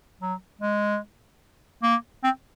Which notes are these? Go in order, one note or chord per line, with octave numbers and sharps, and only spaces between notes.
F#3
G#3
A#3
C4